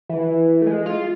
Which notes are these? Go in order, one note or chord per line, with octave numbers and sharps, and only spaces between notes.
E3
A3
G#3
F4